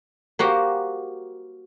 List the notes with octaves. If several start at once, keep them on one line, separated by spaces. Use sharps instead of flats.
A#3 F#4 G4 C5